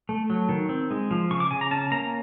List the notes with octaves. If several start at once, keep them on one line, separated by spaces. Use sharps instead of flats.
A3
F#3
D#3
C4
G#3
F3
C#3 C#6
D6
C#3 G#5
A#5
C#4 A5
A#3 A#5